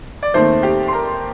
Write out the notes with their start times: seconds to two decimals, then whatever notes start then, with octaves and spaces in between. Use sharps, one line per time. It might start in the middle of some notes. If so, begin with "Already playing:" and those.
0.23 D5
0.34 D#2 D#3 A3 C4 C5
0.63 G4 G5
0.88 C6
0.93 A#4 A#5